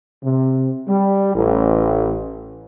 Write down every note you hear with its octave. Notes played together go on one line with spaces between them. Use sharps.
C3
G3
A1